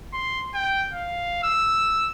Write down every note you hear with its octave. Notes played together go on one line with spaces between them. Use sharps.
C6
G5
F5
E6